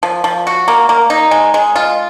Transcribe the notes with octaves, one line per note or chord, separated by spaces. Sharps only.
F3
F3
F#4
A#3
A#3
D#4
G#3
G#3
F4